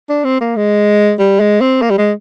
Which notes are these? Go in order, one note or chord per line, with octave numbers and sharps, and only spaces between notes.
D4
C4
A#3
G#3
G3
G#3
C4
A#3
G3
G#3